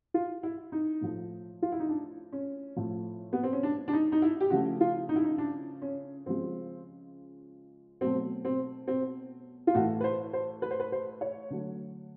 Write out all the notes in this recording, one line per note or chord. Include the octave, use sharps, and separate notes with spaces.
F4
E4
D#4
A2 F3 A3
F4
E4
D#4
D4
C#4
A2 F3 A3
B3
C4
C#4
D4
D4
D#4
D#4
E4
G4
C#3 F3 A3 F#4
F4
D#4
E4
D#4
D4
C#4
C#3 F3 G#3 C4
B2 F#3 A3 C4
C4
C4
F4
A2 E3 A3 F#4
B4
C5
C5
B4
C5
B4
C5
C#5
D3 F#3 A3